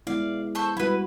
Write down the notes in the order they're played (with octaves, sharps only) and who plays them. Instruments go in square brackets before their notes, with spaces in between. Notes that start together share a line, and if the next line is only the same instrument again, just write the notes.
[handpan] G#3 B3 E4 [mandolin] D5 F5
[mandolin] A4 C5 C#6
[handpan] G3 F#4 [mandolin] E4 B4